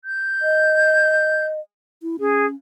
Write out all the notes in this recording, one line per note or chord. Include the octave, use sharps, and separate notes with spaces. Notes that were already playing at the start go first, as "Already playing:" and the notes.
G6
D#5
E4
C#4 G#4